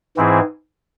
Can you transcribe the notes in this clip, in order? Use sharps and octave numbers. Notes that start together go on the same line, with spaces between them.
G#2 E3 C4 E4 G#4